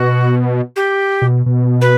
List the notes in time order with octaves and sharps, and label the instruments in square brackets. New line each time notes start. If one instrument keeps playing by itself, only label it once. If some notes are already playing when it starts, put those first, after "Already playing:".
Already playing: [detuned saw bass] B2 [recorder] F#4
[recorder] G4
[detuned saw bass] B2
B2
[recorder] B4